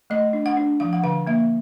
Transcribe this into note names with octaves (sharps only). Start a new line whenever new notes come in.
A3 D#5
D4
F#5
D4
F3 F5
F#5
D3 F5
A#3 E5